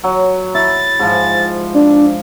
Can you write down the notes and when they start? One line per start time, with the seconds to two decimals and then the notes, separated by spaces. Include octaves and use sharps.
0.04 F#3
0.54 E4 A6
0.99 G#2 F3
1.75 D4